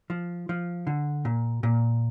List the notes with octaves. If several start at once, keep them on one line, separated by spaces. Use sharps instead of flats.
F3
F3
D3
A#2
A#2